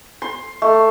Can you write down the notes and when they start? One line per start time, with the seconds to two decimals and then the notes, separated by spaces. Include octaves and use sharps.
0.22 C6
0.62 A3